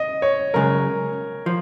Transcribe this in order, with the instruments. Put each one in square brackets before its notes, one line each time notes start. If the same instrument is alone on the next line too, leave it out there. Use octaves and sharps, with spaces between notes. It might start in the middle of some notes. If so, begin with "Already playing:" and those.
Already playing: [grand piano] D#5
C#5
[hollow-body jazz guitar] F#2 C#3 G#3 [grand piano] A#4
[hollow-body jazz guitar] F3